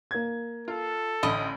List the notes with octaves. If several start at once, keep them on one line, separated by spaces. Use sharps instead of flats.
A#3 G#6
F4 A4
A1 D3 D#5 B5